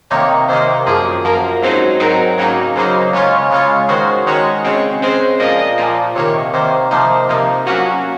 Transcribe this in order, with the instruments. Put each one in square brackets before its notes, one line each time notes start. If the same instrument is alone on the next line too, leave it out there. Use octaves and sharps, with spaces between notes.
[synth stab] C3 D#3 A#3 D#4 [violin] C#5
[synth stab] C3 D#3 A#3 D#4 [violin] C5
[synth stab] F#2 F3 A#3 [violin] G#4
[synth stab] F#2 F3 A#3 [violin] A#4
[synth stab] G#2 F#3 C4 D#4 [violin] C5
[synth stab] G#2 F#3 C4 D#4 [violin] A#4
[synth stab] C#3 F#3 A#3 D#4 [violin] C#5
[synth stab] C#3 F#3 A#3 D#4 [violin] C5
[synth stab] C#3 G#3 C#4 F4 [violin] C#5
[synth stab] C#3 G#3 C#4 F4 [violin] C#5
[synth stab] D#3 G#3 C#4 F#4 [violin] C5
[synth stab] D#3 G#3 C#4 F#4 [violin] C#5
[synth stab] C#3 G#3 C4 [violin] C#5
[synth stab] C#3 G#3 C4 [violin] C5
[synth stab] A#2 F3 A#3 [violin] D#5
[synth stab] A#2 F3 A#3
[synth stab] C3 D#3 A#3 [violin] C#5
[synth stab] C3 D#3 A#3 [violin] C5
[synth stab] C3 F3 A#3 D#4 [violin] C5
[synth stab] C3 F3 A#3 D#4
[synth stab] F#3 A#3 C#4 [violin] F#4